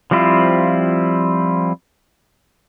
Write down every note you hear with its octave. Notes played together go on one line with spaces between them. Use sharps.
F3 G3 C4 E4 F4